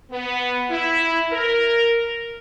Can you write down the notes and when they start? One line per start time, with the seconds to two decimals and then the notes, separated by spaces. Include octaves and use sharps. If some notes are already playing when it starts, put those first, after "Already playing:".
0.12 B3
0.70 E4
1.32 A#4